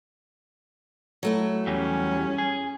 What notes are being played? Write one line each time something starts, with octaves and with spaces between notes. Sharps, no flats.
F#3 A3 E4
E2 G3 C#4
G#4